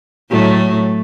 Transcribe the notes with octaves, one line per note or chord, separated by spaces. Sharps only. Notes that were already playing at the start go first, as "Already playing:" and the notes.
A2 F#3 A3